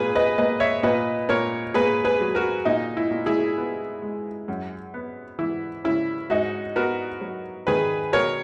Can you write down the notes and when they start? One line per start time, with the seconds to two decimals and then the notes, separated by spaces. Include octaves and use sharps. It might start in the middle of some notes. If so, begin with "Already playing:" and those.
Already playing: A#2 G#4 B4
0.15 B4 D#5
0.38 A#3 B4 D#5
0.60 C#5 E5
0.83 A#2 B4 D#5
1.29 A#2 A#4 C#5
1.74 A#3 G#4 B4
2.05 G#4 B4
2.21 F#3
2.35 F#4 A#4
2.65 A#2 D#4
2.97 E4
3.11 A#2
3.26 E4 G#4
3.58 B3
4.02 G#3
4.48 F#2
4.94 B3
5.39 E3 E4
5.84 C#3 E4
6.30 G#2 D#4 F#4
6.76 B3 F#4 A#4
7.21 F#3
7.67 D#3 G#4 B4
8.13 B2 A#4 C#5